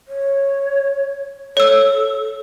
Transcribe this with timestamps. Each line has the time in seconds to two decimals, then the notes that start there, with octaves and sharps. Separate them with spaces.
0.08 C#5
1.57 A4 C#5 E6